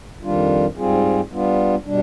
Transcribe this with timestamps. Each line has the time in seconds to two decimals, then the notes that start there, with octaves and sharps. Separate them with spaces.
0.23 F2 D#3 G3 D4 F4
0.77 G#2 G3 C4 F4 G#4
1.32 G3 B3 D4 F4
1.86 B2 G3 D4